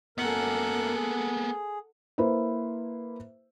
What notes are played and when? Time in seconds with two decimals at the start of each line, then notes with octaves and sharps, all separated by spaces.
0.18 F#2 A#3 B3 A4 A#4 F#5
0.95 G#4
2.18 A#3 E4 B4 C5